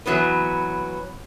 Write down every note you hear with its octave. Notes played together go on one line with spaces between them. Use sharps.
E3 F#3 B3 B4